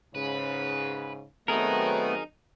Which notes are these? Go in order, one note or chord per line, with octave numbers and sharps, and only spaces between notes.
G#2 C#3 B4
D#3 F#3 A3 B3 C4 D#4 G#4 A#4